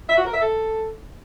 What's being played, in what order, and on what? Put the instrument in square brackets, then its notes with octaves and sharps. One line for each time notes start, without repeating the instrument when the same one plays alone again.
[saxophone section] E5
F#4
A#4
E5
A4